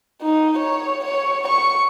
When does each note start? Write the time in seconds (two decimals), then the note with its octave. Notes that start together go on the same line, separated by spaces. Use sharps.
0.22 D#4
0.58 C#5
1.05 C#5
1.48 C#6